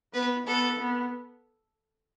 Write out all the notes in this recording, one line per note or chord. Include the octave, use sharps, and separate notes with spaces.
B3 B4
B3 A4
B3